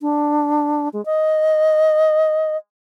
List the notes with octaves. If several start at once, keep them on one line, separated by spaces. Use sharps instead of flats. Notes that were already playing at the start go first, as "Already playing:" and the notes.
D4
G#3
D#5